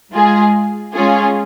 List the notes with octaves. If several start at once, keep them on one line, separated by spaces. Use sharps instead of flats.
G#3 F4 G#4
G#3 C#4 F4 G#4